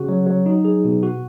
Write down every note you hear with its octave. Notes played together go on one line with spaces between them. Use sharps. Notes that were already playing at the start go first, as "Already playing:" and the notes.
Already playing: C#3 F#4
F#3
F#3
D#4
G#4
B2
F#4